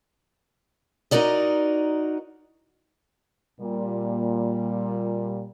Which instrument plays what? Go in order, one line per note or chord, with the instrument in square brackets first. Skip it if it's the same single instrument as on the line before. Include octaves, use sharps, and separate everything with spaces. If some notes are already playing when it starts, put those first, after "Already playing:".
[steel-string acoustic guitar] D#4 F#4 A#4 D5 D#5
[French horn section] A#2 G3